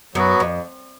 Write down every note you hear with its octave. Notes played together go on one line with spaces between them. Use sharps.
F#2 F#3 B3 F#4 B4
F2